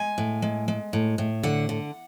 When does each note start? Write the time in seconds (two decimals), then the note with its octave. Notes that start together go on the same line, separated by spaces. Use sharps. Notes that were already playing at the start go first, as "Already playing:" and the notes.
Already playing: G#3 G#5
0.18 A2
0.42 G#3
0.68 G#3
0.93 A2
1.18 A2
1.43 D3 F#5
1.69 D3